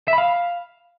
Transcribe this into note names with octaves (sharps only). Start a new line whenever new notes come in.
E5
B5
F5